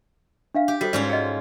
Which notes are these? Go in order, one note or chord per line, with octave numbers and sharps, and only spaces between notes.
D4 E5 F5
G4
G3 F#4 A4 C5 B6
G#2 C#4 F4 D5
D#5 F#5 G5